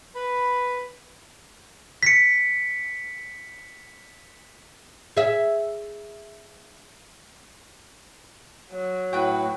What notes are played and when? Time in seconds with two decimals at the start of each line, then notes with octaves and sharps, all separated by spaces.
0.15 B4 B5
2.03 B6 C#7
5.17 G#4 E5
8.71 F#3
9.13 A2 F#4 B4 G5